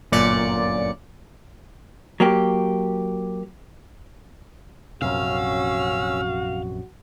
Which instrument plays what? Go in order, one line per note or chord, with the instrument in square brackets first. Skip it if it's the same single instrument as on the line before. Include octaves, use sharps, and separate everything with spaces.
[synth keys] G1 F#2 A#2 D5 C#7
[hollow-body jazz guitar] F#3 A#3 G4
[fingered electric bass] A#1 F#2 C3 [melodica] C#4 E6 [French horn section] F#4 [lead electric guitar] F5